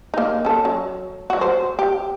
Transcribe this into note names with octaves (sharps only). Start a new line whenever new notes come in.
A#3 D#4
C#4 A4
F#3
F#3 F#4
C5
G4